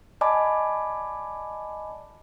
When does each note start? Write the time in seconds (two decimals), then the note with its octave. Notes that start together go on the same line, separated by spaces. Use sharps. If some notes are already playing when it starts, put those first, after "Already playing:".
0.21 D5 D#5 G#5 A5 B5 D6